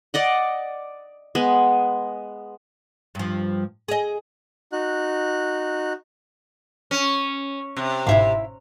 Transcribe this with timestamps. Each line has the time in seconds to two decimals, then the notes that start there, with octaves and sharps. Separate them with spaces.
0.14 D5 D#5 F#5
1.35 G#3 B3
3.15 G2 F3
3.88 G#4 D#5
4.72 D#4 F#4 F#6
6.91 C#4
7.76 C3
8.07 G1 G#2 B2 E4 E5 F5